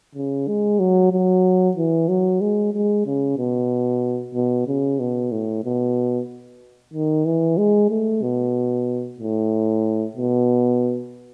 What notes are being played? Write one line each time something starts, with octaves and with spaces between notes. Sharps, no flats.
C#3
G#3
F#3
F#3
E3
F#3
G#3
G#3
C#3
B2
B2
C#3
B2
A2
B2
D#3
E3
G#3
A3
B2
A2
B2